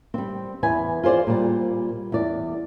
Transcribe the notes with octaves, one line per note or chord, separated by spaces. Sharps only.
G3 C4
E2 B4 G#5
F4 G#4 C5 D5
A#2 G3
E2 D5